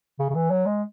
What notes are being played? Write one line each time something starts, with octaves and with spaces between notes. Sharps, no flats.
C#3
C#3
E3
F#3
G#3